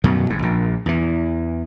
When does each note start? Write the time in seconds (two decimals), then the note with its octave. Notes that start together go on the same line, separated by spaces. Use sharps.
0.04 F#2 B2 D#3 F#3
0.30 G1 G#2
0.43 A#1 A#2
0.86 E2 E3